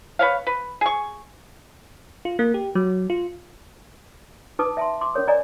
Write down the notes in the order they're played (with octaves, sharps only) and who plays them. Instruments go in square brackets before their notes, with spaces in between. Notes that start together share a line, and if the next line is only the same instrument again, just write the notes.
[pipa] B4 C#5 F5
B4
G#4 C#6
[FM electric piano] F4
A#3
G4
F#3
F4
[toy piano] D#4 B4 A5 D6 D#6
E5 A5 C6
C6 D6
C#4 A#4 C#5 D#6
A#4 D5 D#5 G#5 A#5